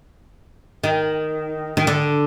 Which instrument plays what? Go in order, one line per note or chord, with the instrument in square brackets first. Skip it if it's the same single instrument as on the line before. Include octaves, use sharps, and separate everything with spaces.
[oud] D#3
D#3
D3